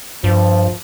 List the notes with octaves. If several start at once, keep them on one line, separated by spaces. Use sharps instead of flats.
G2 F3